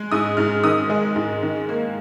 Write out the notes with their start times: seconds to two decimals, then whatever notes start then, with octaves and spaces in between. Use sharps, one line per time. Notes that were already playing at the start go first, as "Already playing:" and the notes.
Already playing: G#3
0.12 G#2 D#6
0.37 G#2 F6
0.64 D#3 D#6
0.90 G#3
1.16 G#2
1.43 D#3
1.69 A#3